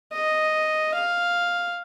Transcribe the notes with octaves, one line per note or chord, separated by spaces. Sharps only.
D#5
F5